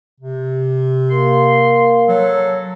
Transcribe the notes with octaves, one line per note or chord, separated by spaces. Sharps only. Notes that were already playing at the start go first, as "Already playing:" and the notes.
C3
A#3 C6
F#3 A4